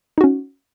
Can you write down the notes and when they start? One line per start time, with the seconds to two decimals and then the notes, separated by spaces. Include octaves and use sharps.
0.18 D#4
0.21 F#4
0.24 C#4